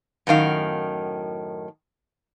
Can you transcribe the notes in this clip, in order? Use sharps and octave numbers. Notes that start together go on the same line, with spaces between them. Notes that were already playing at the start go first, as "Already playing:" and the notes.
F#2 A2 D#3 F5